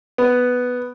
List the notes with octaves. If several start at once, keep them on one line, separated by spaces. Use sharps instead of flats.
B3